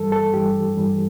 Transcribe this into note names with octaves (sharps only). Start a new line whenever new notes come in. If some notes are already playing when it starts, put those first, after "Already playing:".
Already playing: G2 E3 G3 A4
A4
G2 E3 G3 G4
G2 E3 G3